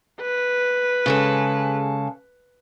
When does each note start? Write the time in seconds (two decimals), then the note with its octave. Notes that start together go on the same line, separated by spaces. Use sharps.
0.21 B4
1.06 C#3 G#3 A4